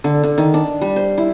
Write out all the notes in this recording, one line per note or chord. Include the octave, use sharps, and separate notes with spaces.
D3
D3
D#3
D4
G3
C5
E4